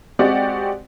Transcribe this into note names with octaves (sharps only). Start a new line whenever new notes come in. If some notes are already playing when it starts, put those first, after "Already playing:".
G#3 C4 F#4 G4 D5 F#5